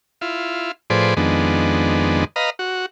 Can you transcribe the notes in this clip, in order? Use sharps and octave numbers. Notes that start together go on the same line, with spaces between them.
E4 F4
A2 F3 G#4 B4 C5 D5
F2 D#3 G#3 B3 D4
B4 D#5 F5 A#5
F#4